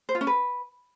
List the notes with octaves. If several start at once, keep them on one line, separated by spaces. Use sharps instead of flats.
C5
F4
C#4
B4